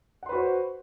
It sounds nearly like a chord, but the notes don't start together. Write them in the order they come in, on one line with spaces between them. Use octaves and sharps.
F#5 C6 B4 F#4 C5